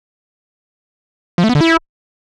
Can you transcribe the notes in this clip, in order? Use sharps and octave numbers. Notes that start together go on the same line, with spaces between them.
F3
A3
B3
D3
E4